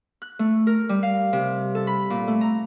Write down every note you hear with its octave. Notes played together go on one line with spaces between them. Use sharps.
F#6
A3
A#4
G3
F5
C3
A4
B5
A#2
A3
A#5